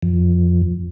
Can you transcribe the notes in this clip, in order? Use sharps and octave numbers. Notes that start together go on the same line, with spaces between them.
F2